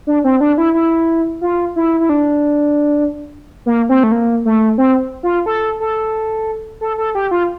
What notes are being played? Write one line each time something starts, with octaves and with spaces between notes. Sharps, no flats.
D4
C4
D4
E4
E4
F4
E4
E4
D4
A#3
C4
A3
A#3
A3
C4
F4
A4
A4
A4
A4
G4
F4